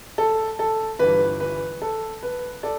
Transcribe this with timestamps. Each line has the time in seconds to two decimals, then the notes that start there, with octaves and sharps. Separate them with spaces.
0.18 A4
0.59 A4
0.99 G1 G2 E3 B4
1.40 B4
1.82 A4
2.23 B4
2.63 A4 D5